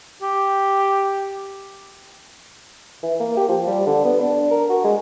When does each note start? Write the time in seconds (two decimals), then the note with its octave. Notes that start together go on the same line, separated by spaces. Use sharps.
0.22 G4
3.03 E3
3.20 A#3
3.37 G4
3.49 F3
3.67 G3
3.87 D3
4.05 B3
4.20 D4
4.51 A#4
4.69 F#4
4.84 G#3